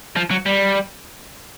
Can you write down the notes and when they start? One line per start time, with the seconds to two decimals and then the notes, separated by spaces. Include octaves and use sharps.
0.16 F3
0.31 F#3
0.46 G3